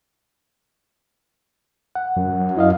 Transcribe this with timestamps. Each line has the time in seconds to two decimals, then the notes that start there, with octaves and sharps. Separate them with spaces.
1.95 F#5
2.16 F#2
2.57 E4 D#5 F5